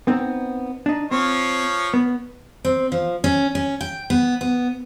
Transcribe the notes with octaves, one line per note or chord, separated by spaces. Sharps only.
B3 C4 D#4
D4 D#4
F3 C4 C#5
B3
C4
F3
C#4
C#4
G5
B3
B3